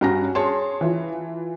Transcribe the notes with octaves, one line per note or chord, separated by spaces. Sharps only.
G2 C#4 F#4 A#5 A#6
G#4 C#5 A5 C6
E3 F4